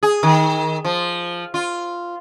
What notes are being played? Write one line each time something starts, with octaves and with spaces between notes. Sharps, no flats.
G#4
D#3
F3
F4